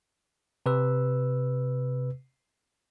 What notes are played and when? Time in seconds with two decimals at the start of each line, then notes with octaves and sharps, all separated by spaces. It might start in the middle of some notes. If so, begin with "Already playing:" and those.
0.66 C3 B4 E6